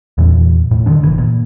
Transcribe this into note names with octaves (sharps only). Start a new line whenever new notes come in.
E2 A#2 E3
A2
D3 D#3 D4
F#1 A#2 E3
A#2